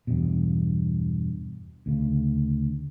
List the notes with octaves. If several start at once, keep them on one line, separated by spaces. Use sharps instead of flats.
E2 G2 B2
D2 C#3